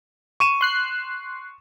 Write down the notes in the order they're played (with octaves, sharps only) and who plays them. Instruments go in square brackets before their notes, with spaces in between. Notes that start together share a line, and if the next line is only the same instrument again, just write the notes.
[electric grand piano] C#6 D#7 E7
[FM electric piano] C6 F#6 C7